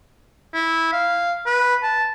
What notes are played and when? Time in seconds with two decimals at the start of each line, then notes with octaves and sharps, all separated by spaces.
0.54 E4
0.93 F5
1.46 B4
1.83 A5